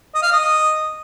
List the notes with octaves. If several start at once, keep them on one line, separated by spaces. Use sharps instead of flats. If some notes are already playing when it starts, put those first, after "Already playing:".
D#5
F5
D#5